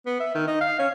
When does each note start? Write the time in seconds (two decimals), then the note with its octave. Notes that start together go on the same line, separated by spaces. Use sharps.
0.06 B3
0.20 E5
0.35 D#3
0.47 D#4
0.61 F5
0.79 C#4